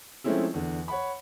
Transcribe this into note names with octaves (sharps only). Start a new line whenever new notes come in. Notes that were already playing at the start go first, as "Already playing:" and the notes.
F3 G#3 A3 C4 C#4 E4
E2 D3
C#5 F#5 B5